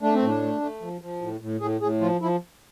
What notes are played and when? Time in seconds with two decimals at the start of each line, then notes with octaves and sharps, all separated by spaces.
0.02 A3 D4
0.13 C4
0.22 A2 D4
0.42 A3
0.61 A3
0.81 F3
1.01 F3
1.21 A2
1.41 A2
1.61 A2 G#4
1.81 A2 G#4
2.00 F3 F4
2.21 F3 E4